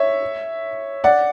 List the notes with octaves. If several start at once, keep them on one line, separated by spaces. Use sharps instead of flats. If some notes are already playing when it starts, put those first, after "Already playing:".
Already playing: C#5 E5
D5 F#5